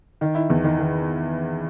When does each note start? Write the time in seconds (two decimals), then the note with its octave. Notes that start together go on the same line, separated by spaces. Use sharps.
0.21 D#3
0.35 E4
0.50 E2
0.64 D#3
0.79 D#3